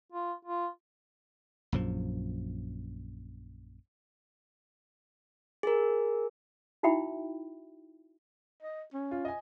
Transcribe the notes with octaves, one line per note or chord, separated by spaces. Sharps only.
F4
F4
A#1 F#2 F3
G#4 A#4
D#4 E4 F#4 E5 G5 B5
D#5
C#4
F4
D#5 G#5